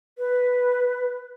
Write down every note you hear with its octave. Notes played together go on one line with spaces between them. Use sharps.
B4